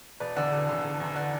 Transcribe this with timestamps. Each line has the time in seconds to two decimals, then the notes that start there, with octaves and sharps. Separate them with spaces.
0.20 E1 B4 D5
0.36 E2 D3 D5 F#5
0.52 E1
0.69 E2 D3
0.84 E1
1.00 E2 D3
1.16 D5 F#5